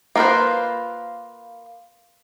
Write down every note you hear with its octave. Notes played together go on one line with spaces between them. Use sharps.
A#3 B3 F4 B4 C5